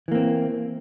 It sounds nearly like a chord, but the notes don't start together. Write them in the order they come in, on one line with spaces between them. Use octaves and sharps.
E3 A#3 C4